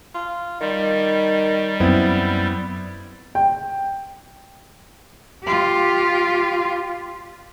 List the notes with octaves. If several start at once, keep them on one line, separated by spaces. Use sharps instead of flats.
F4
D#3 G3
F#2 B3 C4 E4
G5
F4 G4